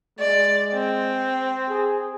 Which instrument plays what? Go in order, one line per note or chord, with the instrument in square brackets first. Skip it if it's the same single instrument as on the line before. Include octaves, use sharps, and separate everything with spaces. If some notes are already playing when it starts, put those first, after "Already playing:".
[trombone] G#3 [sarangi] D5
[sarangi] C4
[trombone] G#4